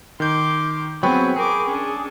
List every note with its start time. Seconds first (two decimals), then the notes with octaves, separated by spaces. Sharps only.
0.20 D#3 C6 D6 G6
1.03 F#3 B3 C4 G#4 G5 B5 C#6
1.36 G#4 A#4 D6
1.67 C#4 D4